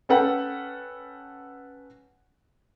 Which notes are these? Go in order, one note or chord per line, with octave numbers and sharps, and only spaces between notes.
C#4 A4 B4 F#5 G5